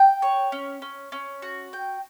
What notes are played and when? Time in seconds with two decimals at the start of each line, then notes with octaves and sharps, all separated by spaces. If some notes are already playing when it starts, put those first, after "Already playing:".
Already playing: G5
0.22 C#5
0.52 C#4
0.82 C#4
1.12 C#4
1.42 F#4
1.73 G5